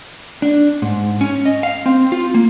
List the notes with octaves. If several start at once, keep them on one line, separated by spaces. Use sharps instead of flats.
D4
G#2
C#4
D#5
F5
C4
F4
A#3